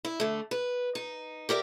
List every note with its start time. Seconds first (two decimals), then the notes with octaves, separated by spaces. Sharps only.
0.05 E4
0.20 D3 A3
0.51 B4
0.95 D#4
1.49 G4 A#4 D5 E5